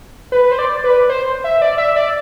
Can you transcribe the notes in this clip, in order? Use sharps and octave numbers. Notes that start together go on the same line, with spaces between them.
B4
C5
D5
B4
C5
E5
D5
E5
D5